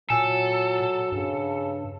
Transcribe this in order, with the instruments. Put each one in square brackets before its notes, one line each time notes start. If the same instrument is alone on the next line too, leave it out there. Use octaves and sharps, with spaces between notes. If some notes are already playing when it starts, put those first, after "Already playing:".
[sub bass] A#2 [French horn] F#3 [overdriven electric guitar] A4 [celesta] G#5 E6 E7
[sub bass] G2 [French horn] C#3